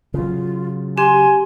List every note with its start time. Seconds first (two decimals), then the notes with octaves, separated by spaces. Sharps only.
0.14 C#3 F#3 F4
0.98 G4 G#5 C6